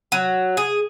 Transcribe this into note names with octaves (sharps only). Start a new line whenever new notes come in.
F#3
G#4